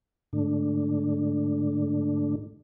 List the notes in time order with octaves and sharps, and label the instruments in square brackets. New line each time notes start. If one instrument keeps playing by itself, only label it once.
[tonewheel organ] G#2 D3 A3 D4